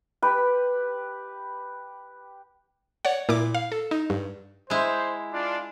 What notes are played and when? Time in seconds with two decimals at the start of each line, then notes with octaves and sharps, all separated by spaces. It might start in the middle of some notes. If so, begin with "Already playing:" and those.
0.22 G4 B4 B5
3.05 C#5 D5 F#5
3.29 A#2 E4 D6
3.55 F5
3.72 A4
3.91 D#4
4.10 G2
4.70 G#3 E4 C5
5.32 D4 F4